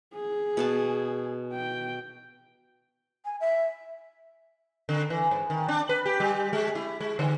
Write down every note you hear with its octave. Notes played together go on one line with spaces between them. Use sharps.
G#4
B2 F#5 A5
G5
G#5
E5
D3
E3
G#2
D#3
D4
B4
G4
G3
G#3
E4
G#3
D3